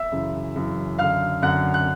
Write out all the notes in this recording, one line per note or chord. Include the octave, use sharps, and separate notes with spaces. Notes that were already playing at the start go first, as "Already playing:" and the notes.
Already playing: E5 E6
F#2 C#3 E3
F#2 C#3 E3
F#2 D3 F5 F6
F#2 D3 F#5 F#6
F#6